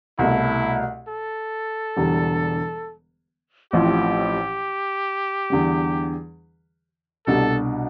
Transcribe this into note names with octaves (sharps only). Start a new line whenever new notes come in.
C2 B2 A3 E4
A4
E1 E2 D3 G3
A1 A2 F3 C4 E4 G4
E2 D3 G3
C2 B2 G3 D4 A4